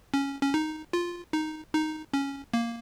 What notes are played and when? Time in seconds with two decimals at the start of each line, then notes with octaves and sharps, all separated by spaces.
0.14 C#4
0.42 C#4
0.54 D#4
0.93 F4
1.33 D#4
1.74 D#4
2.13 C#4
2.54 A#3